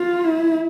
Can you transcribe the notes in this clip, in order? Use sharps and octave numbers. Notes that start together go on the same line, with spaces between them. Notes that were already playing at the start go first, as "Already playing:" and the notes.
Already playing: F4
E4